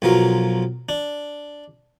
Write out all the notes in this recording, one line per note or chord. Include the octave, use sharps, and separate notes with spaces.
B1 F3 F#3 A#4
D4